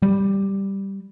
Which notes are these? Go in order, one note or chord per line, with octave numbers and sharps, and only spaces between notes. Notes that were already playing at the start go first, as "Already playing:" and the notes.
G3